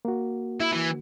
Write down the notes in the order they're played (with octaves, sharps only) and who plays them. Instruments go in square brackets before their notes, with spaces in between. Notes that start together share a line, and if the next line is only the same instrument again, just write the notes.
[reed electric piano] A#3 F#4
[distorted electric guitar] E4
E3